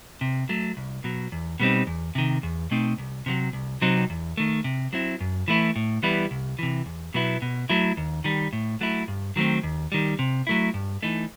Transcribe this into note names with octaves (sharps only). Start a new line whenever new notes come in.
C3
F#3 A3
C2
B2 F#3
E2
B2 G3 C4 D#4
E2
C3 D#3
E2
B2 A3 C4 D#4
C2
C3 D#3 F#3
C2
C3 F#3 C4 D#4
E2
D#3 A3
C3
F#3 C4 E4
F#2
E3 A3 E4
A2
E3 G3 B3 E4
C2
C3 E3
E2
B2 F#3 B3 E4
B2
F#3 A3 E4
D#2
D#3 G3
A2
F#3 A3 E4
G2
D#3 F#3 A3 C4
D#2
D#3 G3
C3
F#3 A3 E4
G2
E3 A3 D#4